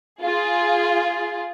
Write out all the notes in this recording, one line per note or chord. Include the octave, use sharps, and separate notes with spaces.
F4 G#4